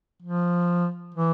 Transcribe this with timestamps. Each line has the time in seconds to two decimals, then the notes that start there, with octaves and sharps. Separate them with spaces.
0.23 F3
1.15 E3